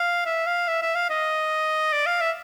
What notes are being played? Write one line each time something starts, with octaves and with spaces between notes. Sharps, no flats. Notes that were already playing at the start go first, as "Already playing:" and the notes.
Already playing: F5
E5
F5
E5
E5
F5
D#5
D5
F5
E5